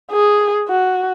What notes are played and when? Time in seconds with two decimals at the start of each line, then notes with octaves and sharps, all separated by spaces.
0.12 G#4
0.68 F#4